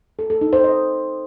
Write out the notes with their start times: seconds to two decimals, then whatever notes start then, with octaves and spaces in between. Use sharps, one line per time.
0.19 A4
0.30 A4
0.41 D#4
0.53 C5
0.64 D#5